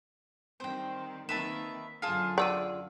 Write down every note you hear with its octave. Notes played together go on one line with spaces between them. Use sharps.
D#3 G3 C4 C5 G5
D#3 A#3 C4 B4 E5 A5 E7
F#2 D3 F4 G#4 A5
D5 F#5 E6 D#7